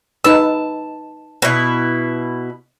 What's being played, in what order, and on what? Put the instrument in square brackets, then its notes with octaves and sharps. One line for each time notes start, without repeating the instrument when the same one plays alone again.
[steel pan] D#4 B4 E6 [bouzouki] A5
[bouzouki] B2 E4